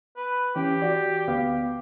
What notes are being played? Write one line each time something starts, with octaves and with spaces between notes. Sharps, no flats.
B4
E3 C#4 G4
F#4 D5
D2 B3 F5